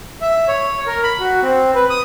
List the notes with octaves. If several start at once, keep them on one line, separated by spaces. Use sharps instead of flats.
E5
C#5
A#4
B5
F#4
C4
B4
D#6